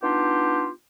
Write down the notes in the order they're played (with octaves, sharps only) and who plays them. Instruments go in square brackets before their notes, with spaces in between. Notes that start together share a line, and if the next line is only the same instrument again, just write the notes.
[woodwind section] B3 D4 D#4 F4 G4